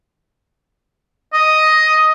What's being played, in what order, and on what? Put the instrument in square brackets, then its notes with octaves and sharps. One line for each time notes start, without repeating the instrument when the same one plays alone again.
[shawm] D#5